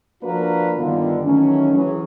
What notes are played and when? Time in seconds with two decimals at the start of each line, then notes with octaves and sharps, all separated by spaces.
0.23 F3 A#3 D4 F#4 A#4 B4
0.77 G2 D3 D#3 B3 F4
1.24 D#3 E3 F#3 A3 C#4
1.74 E3 F#3 C#4 E4 G#4